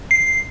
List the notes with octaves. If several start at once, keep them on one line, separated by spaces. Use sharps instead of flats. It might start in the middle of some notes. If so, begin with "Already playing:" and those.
C7